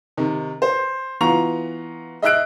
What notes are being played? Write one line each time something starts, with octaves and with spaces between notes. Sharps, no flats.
C3 D#3
C5
E3 B3 F4 A#5 C#6 F7
D#5 E5 E6 F#6 D7